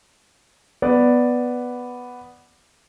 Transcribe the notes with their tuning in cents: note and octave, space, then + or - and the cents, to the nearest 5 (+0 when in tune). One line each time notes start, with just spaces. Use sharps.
B3 +0 D5 +0